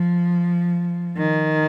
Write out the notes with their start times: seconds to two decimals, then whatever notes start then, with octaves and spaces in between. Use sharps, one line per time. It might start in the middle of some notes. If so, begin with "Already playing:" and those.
Already playing: F3
1.18 D#3